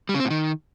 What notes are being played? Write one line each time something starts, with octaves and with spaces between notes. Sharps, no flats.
G3
C#3
C4
A2
D#3